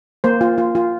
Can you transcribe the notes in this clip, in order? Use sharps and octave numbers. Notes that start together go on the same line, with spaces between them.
A#3 C5
F4
F4
F4